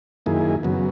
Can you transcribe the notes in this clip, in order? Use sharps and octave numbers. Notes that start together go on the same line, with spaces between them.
F#2 D#3 A#3 E4 G#4
F#2 C#3 F#3 B3